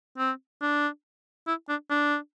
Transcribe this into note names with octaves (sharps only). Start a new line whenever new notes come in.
C4
D4
E4
D4
D4